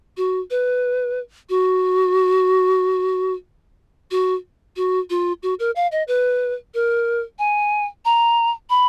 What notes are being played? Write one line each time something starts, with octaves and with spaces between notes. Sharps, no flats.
F#4
B4
F#4
F#4
F#4
F4
F#4
A#4
F5
D#5
B4
A#4
G#5
A#5
B5